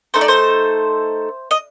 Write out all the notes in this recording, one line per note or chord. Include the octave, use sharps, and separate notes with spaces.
A3 D#4 A4 C5
D5
C5
D#5